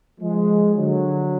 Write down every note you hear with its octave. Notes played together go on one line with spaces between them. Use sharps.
F3 G#3
D3 F#3